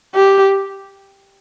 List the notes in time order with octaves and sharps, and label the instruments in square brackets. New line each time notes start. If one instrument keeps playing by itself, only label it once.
[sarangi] G4